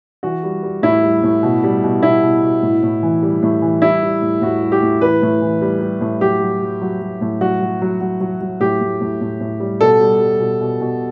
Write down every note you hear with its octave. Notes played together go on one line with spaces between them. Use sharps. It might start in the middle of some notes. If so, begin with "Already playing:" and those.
E3 F#4
G3
G3
A2 E4
G3
A2
B2
G3
B2
B2 E4
B2
B2
A2
A2
E3
G3
A2
E3
G3 E4
G3
A2
A2 F#4
G3
G4
A2
E3 B4
A2
E3
G3
G3
A2
F#3 G4
F#3
F#3
F#3
F#3
A2
F#3 F#4
F#3
F#3
F#3
F#3
F#3
A2 G4
A2
A2
A2
A2
G3
B2 A4
G3
G3
B2
B2
B2